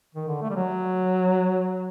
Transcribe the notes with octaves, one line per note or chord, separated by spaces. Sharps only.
D#3
D3
A3
G3
F#3